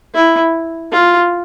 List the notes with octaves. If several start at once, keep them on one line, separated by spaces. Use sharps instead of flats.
E4
F4